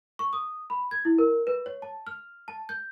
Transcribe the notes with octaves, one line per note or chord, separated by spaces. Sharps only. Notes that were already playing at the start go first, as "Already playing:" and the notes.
C#6
D#6
B5
G#6
E4
A#4
B4
C#5
A5
F6
A5
G6